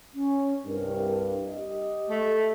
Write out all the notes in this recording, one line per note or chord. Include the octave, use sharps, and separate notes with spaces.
C#4
C2 G2 A#4
G4 D#5
A3